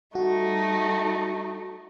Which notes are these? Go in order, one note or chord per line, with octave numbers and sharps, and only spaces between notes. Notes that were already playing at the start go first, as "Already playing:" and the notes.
G3 A3 D#4 F#4